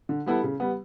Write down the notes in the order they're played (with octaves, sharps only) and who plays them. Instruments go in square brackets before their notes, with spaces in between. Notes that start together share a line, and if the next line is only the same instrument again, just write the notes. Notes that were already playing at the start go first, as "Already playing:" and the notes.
[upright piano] D3
G3 B3 E4 A4
C#3
G3 B3